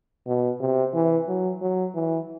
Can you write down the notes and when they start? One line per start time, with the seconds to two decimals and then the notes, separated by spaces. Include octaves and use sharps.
0.27 B2
0.60 C3
0.94 E3
1.28 F#3
1.62 F#3
1.95 E3